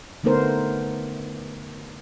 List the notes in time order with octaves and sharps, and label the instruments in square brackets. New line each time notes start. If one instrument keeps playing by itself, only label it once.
[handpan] D3 A3 B3 D#4 A#4 C5